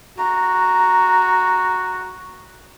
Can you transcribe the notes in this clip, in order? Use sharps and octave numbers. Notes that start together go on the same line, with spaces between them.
F#4 A#5